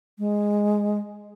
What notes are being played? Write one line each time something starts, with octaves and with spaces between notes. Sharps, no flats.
G#3